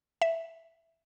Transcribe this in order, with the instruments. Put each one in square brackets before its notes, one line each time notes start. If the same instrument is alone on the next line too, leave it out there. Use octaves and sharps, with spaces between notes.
[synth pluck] E5